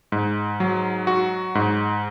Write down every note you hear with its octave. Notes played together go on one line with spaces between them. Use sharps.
G#2
F#3
F#4
G#2